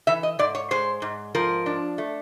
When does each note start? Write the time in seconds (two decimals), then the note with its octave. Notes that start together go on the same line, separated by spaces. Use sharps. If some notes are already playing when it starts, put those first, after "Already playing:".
0.07 E3 E5
0.23 D#5
0.39 G#2 D5
0.55 C#5
0.71 G#3 C5
1.02 G#2
1.35 F3 A#4
1.66 D4
1.98 A3